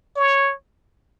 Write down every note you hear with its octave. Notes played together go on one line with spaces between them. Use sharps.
C#5